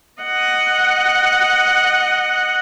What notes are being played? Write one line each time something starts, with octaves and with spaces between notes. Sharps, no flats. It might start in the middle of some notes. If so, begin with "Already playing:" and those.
D#5 F#5